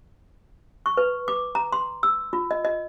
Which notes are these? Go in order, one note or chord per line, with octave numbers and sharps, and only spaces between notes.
C#6
B4
D6
A#5
C6
E6
F4
D#5
D#5